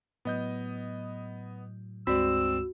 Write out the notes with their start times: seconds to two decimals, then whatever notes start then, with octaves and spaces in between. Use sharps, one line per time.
0.25 A2 F#3 B3 D#5 G6
2.07 C#2 G2 G#3 C4 F#4 D5 E6